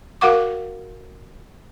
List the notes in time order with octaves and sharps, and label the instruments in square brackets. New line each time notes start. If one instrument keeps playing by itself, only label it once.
[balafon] F#4 A#4 F5 F#5 C#6 D6